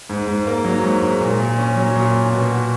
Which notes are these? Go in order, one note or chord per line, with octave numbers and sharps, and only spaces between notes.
G#2
G#2
A#3
F#3
G#2
G#2
A#2
A#2
C#4
F#3
A#2
A#2
B2
F#4